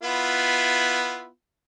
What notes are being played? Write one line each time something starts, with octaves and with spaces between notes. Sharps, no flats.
B3 E4 F4